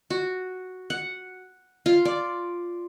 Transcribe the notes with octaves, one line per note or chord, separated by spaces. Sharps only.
F#4
F#5
F4
D5